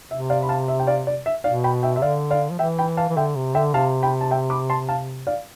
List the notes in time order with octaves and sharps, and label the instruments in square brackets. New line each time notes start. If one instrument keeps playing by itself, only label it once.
[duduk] C3 [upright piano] E5
[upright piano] D5 F5
B5
F5 A5
E5
G5
D5 F5
D5
E5
[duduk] B2 [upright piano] D5 F5
[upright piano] G5 B5
E5 G5
[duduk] C3 [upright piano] E5
[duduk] D3 [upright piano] D5 F5
[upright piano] D5 F5
[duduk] F3
[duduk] E3 [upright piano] E5 G5
[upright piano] G5 B5
F5 A5
[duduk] E3
[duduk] D3 [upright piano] E5 G5
[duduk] C3
[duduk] D3 [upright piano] E5 G5
[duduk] C3 [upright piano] F5 A5
[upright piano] G5 B5
A5
E5 G5
B5 D6
A5 C6
F5 A5
D5 F5